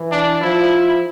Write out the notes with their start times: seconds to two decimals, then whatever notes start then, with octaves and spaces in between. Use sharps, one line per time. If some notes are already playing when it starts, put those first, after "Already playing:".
Already playing: E3
0.11 D4
0.41 F3 E4